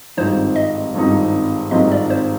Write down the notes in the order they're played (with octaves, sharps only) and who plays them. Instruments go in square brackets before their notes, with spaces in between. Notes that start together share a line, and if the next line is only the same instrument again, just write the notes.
[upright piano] G#1 G2 F3 C4 D#4 [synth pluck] C5
[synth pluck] D#5
[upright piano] G#1 G2 F3 C4 D#4
[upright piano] G#1 G2 F3 C4 D#4 [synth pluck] D#5
[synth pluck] D5
C5